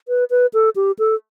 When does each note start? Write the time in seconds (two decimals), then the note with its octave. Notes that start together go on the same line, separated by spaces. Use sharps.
0.08 B4
0.30 B4
0.54 A4
0.76 G4
0.99 A4